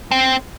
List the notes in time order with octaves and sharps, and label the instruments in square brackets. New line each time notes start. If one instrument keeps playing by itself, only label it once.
[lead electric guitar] C4